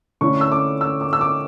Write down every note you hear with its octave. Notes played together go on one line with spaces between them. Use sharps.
D3 A3 C#4 E4 C#6
E6
D6
E6
D6
E6
D6